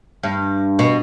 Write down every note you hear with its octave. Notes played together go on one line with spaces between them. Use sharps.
G2
B2